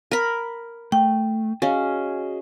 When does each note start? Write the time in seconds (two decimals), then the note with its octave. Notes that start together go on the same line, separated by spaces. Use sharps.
0.11 A#4 B5
0.92 A3 G5
1.62 C#4 F#4 G#4 D#5 F5